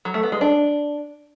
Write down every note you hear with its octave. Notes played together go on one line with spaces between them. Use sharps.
F#3
A3
B3
G#3
D4